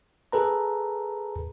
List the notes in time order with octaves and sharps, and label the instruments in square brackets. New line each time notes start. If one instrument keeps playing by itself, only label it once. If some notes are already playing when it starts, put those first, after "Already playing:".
[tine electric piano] G#4 A4 B4 A#5